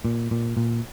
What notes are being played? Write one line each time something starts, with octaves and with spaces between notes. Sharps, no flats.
A#2
A#2
A#2